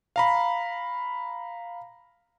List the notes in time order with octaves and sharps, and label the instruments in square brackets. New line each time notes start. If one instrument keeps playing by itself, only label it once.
[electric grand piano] F5 A#5 B5